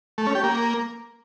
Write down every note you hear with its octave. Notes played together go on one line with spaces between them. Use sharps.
A3
C#4
G4
A#3